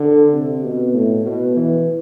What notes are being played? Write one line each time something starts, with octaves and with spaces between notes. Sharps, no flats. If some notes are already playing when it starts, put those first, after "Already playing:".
Already playing: D3
C3
B2
A2
B2
E3